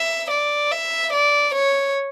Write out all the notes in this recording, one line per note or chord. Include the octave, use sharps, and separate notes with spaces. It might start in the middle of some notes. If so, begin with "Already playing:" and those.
Already playing: E5
D5
E5
D5
C#5